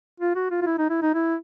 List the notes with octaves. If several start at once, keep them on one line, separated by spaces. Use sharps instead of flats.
F4
F#4
F4
F4
E4
D#4
E4
D#4
E4